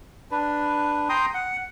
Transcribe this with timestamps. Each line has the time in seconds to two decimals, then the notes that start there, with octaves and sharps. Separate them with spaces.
0.31 D4 B4
1.09 G5 A#5 C6 D#6
1.34 F#5